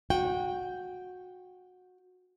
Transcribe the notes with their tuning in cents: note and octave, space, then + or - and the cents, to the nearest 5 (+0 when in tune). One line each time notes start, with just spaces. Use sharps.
F#4 -20 G5 +0